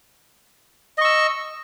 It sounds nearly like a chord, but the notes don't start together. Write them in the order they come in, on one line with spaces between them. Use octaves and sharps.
D#5 C#6 E6